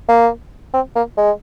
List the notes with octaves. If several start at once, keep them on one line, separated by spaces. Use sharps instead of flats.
A#3
C4
A#3
G#3